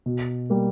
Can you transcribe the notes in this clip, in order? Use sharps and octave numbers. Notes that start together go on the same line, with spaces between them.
B2
G3 A#3